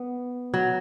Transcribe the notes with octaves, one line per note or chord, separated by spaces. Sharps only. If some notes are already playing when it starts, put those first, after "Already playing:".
Already playing: B3
F#3